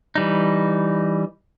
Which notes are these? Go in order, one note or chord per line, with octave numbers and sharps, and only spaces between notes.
E3 G3 D#4